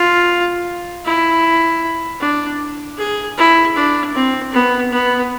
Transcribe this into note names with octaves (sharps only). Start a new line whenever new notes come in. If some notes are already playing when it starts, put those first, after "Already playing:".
Already playing: F4
E4
D4
G#4
E4
D4
C4
B3
B3